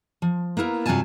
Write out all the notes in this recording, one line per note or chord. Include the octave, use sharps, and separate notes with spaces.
F3
A#3 B3 E4 A#4
G2 C3 F#3 F4 G#5 A5